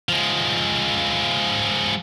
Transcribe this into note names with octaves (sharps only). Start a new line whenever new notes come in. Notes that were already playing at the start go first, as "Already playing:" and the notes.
F3 G#3